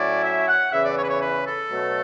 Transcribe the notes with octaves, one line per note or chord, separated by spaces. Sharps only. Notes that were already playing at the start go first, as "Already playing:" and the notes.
Already playing: A2 F#3 C#4 E4 D5
E5
F#5
E2 C#3 E3 E5
D5
C#5
B4
C#5
B4
A4
B2 F#3 A3